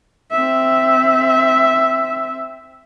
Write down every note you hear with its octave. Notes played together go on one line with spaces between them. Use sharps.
C4 E5